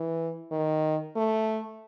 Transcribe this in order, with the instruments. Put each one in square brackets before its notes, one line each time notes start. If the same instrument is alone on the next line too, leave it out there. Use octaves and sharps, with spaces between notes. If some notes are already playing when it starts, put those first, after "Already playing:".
Already playing: [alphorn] E3
D#3
A3